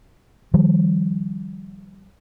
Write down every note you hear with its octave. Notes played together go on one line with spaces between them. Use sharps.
D#3 F3 G3